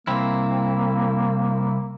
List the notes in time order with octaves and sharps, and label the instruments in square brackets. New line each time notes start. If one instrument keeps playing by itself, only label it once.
[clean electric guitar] C2 C4 E4 [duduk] A#3